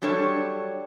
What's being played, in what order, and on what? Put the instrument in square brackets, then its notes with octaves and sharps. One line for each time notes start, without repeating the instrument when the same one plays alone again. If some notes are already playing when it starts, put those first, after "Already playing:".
[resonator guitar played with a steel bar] F#3 G3 D4 A4 C#5